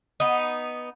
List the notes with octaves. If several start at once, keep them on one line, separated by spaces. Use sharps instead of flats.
B3 D#4